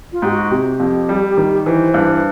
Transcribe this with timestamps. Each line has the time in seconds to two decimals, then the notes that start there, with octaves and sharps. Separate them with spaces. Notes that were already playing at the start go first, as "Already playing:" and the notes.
0.12 F4
0.22 G#2 G4
0.32 F#4
0.51 C3 G4
0.80 F2
1.09 G3
1.37 D#3
1.66 E3 C5
1.94 G2